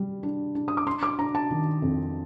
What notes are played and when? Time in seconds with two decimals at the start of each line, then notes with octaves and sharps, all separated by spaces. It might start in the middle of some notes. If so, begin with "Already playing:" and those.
Already playing: G3
0.23 D4
0.55 D4
0.68 D#6
0.77 D6
0.87 D4 C6
1.03 D6
1.19 D4 A#5
1.35 A5
1.50 D#3
1.82 F2